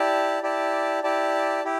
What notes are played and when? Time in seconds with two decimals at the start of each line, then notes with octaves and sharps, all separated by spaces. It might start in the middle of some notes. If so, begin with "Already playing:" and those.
Already playing: E4 G4 D5 A5
0.43 E4 G4 D5 A5
1.04 E4 G4 D5 A5
1.64 E4 G4